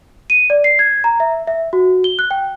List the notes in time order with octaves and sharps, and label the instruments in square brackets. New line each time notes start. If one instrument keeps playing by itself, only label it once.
[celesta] D#7
D5
C7
G#6
A#5
E5
E5
F#4
G7
F#6
G5